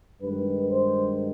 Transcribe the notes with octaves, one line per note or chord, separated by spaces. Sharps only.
G2 D#3 G#3 B4
C5